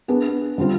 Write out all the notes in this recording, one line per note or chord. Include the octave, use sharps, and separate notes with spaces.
B3 D4 G#4 B4
D3 G3 C4 F4